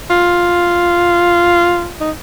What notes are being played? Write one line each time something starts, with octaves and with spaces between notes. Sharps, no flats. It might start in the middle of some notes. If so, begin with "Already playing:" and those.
F4
D#4